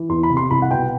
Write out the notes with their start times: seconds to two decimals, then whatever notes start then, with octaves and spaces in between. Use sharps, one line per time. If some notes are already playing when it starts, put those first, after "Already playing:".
Already playing: E3
0.09 E2 C6
0.23 B5
0.30 C3
0.37 C6
0.51 C2 B5
0.62 F#5
0.71 B2 G5